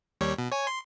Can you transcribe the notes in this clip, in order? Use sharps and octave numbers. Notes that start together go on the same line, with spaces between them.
D#2 G3 C#5
B2
C#5 G#5
C6